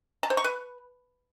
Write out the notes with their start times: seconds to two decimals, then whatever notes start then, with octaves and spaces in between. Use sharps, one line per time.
0.23 A5
0.30 C5
0.37 C#6
0.44 B4